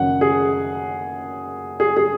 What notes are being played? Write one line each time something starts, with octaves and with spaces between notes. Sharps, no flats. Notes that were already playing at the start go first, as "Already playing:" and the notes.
Already playing: F#1 F#2 D#3 F#3 F#5
G#4
G#4
G#4